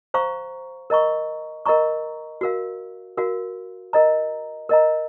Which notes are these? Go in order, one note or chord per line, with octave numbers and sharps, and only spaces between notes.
C5 F5 A#5 C#6
A#4 D#5 A#5 C#6
A#4 D#5 A#5 C#6
F#4 A#4 F5
F#4 A#4 F5
A#4 D#5 A#5
A#4 D#5 A#5